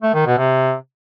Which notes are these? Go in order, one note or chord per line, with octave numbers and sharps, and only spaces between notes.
A3
D#3
B2
C3